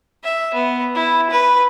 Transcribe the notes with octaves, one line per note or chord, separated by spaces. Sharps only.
E5
B3
E4
B4